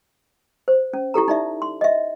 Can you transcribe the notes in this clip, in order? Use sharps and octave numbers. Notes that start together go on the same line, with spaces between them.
C5
C#4
E4 G4 A4 A#5
D#4 D5 E5
C6
D#5 E5